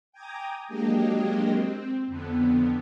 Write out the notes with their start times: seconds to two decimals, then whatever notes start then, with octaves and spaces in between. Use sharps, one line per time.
0.12 G5 G#5 A#5 D6 D#6
0.68 F#3 G#3 A#3 D4 G4 D#5
1.50 C4
2.07 F2 D3 B3